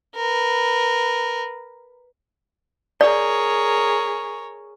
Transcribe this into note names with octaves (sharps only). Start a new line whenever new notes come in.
A#4 B4
G#4 A#4 C#5 D5